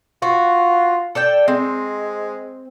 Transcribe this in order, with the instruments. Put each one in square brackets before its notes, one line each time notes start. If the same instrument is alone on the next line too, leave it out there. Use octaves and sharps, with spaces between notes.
[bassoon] F4 [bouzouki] F#4
[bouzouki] A4 D5 G5
[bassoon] G#3 [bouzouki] C4